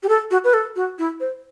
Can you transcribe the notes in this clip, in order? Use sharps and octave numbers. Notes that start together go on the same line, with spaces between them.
G4
A4
F#4
B4
A4
F#4
E4
C5